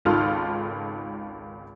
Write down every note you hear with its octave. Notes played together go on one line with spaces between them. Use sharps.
G#1 C#2 D#3 F4 A4 F6